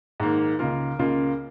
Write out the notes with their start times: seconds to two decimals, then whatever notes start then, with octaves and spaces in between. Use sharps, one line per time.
0.20 G#2 D#3 A#3
0.59 C#2 C#3 A#3 F4 A#4
0.99 C#2 C#3 A#3 F4